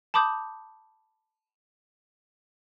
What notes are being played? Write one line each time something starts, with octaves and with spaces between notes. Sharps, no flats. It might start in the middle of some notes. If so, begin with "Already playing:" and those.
A5 B5 D6 D#6 G6